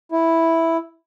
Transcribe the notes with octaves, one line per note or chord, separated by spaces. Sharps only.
E4